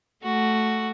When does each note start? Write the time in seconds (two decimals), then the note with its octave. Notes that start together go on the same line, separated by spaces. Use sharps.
0.23 A3 F#4